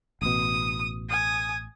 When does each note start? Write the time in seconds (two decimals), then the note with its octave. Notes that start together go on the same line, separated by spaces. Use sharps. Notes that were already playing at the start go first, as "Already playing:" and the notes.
0.22 A1 B2 D#6
1.10 G#5 D#6